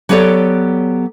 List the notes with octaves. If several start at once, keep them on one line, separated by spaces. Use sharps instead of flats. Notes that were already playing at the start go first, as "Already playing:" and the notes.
F#3 B3 G4 A4 C#5 D5